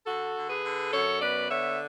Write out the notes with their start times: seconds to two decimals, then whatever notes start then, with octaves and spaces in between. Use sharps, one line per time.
0.06 D3 F#4 A4
0.35 D3
0.49 G#4 B4
0.64 D3
0.92 F#2 A4 C#5
1.21 B3 B4 D5
1.49 D3 C#5 E5